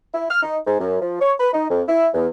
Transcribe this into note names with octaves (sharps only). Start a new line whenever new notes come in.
E4
F6
D#4
G#2
F#2
F3
C#5
B4
D#4
F2
E4
E2